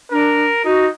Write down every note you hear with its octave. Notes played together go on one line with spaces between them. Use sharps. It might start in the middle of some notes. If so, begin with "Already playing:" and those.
D4 A#4
D#4 F#4